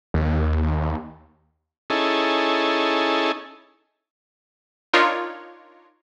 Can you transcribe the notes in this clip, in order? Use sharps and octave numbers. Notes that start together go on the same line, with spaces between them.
D#2
C#4 D#4 E4 G#4 A4
D4 D#4 F4 A#4 C#5